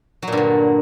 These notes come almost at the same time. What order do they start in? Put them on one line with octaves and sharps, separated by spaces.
F#3 A#2 G2 D3